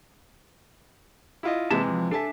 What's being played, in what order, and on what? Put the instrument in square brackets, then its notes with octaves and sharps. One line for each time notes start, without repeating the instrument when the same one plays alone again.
[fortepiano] E4 F4 D#5
[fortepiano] C3 E3 G#3 [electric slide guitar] A#3 E5 A5
[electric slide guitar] F3
[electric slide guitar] D4 E5 [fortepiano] A4 G#5 A5